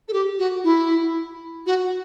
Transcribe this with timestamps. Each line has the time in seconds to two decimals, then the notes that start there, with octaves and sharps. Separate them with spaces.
0.08 A4
0.13 G4
0.38 F#4
0.64 E4
1.66 F#4